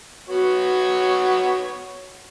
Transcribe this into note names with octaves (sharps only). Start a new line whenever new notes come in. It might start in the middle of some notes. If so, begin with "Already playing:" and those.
B3 F#4 C#5